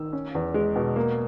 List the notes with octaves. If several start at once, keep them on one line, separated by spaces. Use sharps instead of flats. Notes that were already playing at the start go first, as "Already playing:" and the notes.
Already playing: D#3 E6
C#4
E2
G#3
B2
A#3